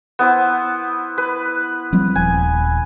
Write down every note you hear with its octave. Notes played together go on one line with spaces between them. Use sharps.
B3 E4 C5
B4
F3 G3 C4
D#1 G#5